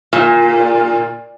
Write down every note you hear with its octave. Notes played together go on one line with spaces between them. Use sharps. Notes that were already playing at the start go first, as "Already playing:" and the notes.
A#2